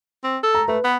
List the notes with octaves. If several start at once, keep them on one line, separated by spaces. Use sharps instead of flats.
C4
A4
A#5
A3 B4
B3